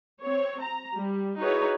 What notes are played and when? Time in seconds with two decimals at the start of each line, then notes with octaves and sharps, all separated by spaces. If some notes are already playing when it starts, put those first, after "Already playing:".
0.21 C4 C#5
0.60 A#5
0.95 G3
1.41 D#4 E4 F#4 G#4 B4 C#5